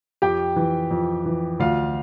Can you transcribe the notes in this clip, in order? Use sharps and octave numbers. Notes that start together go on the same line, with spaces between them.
F2 G4 G5
E3
F2
E3
D2 F4 F5